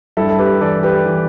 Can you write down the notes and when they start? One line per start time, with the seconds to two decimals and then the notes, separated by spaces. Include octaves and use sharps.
0.17 G2 E4 A4
0.29 A4
0.39 G4 B4
0.61 E3 A4 D5
0.83 G4 B4
1.06 E3